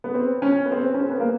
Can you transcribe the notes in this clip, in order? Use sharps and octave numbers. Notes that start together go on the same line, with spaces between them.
B3
C4
C#4
B3
C4
C#4
C4
B3
A#3